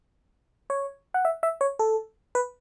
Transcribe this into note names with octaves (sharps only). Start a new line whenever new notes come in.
C#5
F#5
E5
E5
C#5
A4
B4